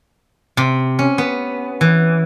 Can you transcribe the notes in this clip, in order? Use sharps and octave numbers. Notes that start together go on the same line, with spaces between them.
C3
C#4
B3
E3